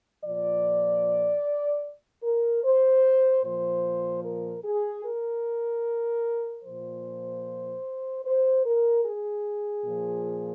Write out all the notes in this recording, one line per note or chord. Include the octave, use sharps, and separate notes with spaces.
A#2 F3 D5
A#4
C5
A#2 F3 C5
A#4
G#4
A#4
A#2 F3 C5
C5
A#4
G#4
A#2 F3